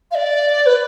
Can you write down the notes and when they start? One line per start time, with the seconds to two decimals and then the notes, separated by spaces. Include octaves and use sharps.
0.11 F5
0.15 D5
0.66 B4